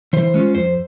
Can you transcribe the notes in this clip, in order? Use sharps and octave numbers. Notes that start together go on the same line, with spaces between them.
E3 C5
G#3 C#4 F4
F2 C5